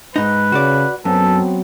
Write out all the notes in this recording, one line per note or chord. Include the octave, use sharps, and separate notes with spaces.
G#2 D#4 B4
C#3 F#4 D5
F#2 F#3 B3 C4 A4